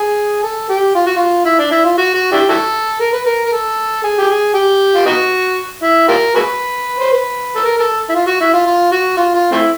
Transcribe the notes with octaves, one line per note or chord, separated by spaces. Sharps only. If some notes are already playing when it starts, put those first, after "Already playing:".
Already playing: G#4
A4
G4
F4
F#4
F4
E4
D4
E4
F4
F#4
F#4
D4 E4 G4
E4 F#4 A4
A#4
B4
A#4
A#4
A4
G#4
G4
G#4
G4
F4
B3 D#4 F#4
E4
F4 G4 A#4
F#4 G#4 B4
C5
B4
A4
A#4
A#4
A4
E4
F4
F#4
E4
F4
F4
F#4
F4
F4
A3 C4 E4